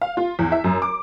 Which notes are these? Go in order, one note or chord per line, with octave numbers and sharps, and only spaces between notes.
F5
F4
E2
E5
F#2
D6